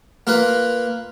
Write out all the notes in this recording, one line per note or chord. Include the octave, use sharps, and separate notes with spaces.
A#3 F4 B4